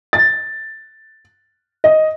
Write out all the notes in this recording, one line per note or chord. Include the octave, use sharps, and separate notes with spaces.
A6
D#5